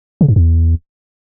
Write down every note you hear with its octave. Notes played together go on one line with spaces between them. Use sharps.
C#3
G2
E2